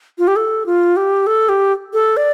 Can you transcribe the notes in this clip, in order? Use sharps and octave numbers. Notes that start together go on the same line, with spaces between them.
F4
G4
A4
F4
G4
A4
G4
A4
D5